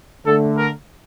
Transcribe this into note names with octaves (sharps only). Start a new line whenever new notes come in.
D3 A3 A4
A#4